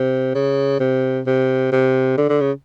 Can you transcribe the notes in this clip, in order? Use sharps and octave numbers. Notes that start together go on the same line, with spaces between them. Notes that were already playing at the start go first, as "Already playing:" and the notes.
Already playing: C3
C#3
C3
C3
C3
D3
D3
C#3